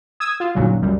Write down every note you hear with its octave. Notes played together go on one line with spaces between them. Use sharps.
D#6 E6 G#6
F4
G1 D#2 A#2 C#3 F#3
C#2 F#2 G3